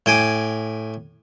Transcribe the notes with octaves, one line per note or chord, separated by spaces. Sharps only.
A2 G5 G#5 D6